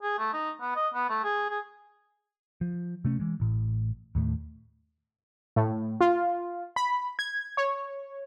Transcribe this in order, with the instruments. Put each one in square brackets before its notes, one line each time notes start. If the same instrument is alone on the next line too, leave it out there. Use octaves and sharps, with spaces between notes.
[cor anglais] G#4
A3
D#4
B3
D#5
B3
A3
G#4
G#4
[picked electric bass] F3
C3 A3 C#4
E3 G#3
A1 A2
D#2 A2 G3 A3
[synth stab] A2
F4
B5
G#6
C#5